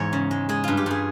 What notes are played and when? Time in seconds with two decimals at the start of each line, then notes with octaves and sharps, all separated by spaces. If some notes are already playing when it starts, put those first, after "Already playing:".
Already playing: E2 G#2 G#3 C#5 E5
0.13 C#3
0.31 G#3
0.49 G#3 G#4
0.64 G2 F4
0.77 G4
0.86 G2 G#4